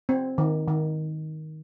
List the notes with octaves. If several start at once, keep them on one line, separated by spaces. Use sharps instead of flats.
C4
D#3
D#3